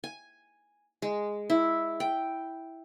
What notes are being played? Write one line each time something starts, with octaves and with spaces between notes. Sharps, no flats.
G#5
G#3
E4
G5